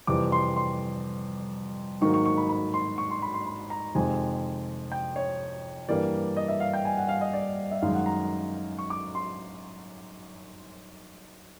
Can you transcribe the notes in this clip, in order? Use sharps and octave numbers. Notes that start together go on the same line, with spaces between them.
F2 C3 E3 G3 D6
C6
C6
G#2 D#3 F#3 A#3 C#6
C#6
C#6
B5
B5
C6
C#6
C6
B5
C6
B5
A#5
F2 C3 D#3 G#3 G#5
G5
C#5
G2 E3 G3 A#3 D5
D#5
E5
F5
G5
G#5
F#5
F5
D#5
D5
E5
F#2 D#3 G#3 F5
F#5
A#5
C#6
D6
C6